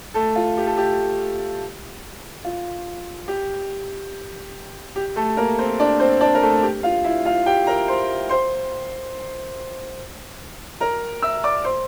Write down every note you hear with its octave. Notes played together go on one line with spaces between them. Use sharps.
A3 A4
F4
G4
A4
G4
F4
G4
G4
A3 A4
A#3 A#4
C4 C5
D4 D5
C4 C5
D4 D5
A#4
A3 A4
G4
F4 F5
E4 E5
F4 F5
G4 G5
A#4 A#5
C5 C6
C5 C6
A#4 A#5
E5 E6
D5 D6
C5 C6